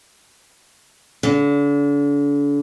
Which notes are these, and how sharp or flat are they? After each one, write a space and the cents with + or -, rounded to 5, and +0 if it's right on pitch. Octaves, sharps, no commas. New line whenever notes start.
D3 -40